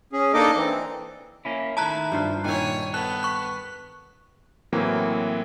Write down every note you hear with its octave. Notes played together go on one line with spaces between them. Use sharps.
C#4 G#4
A#3 D4 D#4 A4 D#5 D6
E3 C4
A#3 C#4 E4
D#3 A3 E4 A5 A#5 F#6
G2 F4 C5
A#2 D#3 E4 C#5 G#5
B3 A4 F#6
C#6 F#6
A2 E3 F#3 A#3 C4